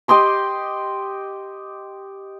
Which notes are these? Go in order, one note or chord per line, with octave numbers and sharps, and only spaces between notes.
G4 D#5 C6 D6